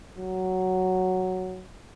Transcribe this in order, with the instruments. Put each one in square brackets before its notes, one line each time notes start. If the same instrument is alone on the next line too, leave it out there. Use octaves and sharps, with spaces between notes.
[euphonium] F#3